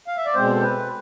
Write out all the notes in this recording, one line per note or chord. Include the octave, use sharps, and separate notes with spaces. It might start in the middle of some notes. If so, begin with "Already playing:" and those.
F5
E5
D5
B2 G#3 C4 C5
A4
B4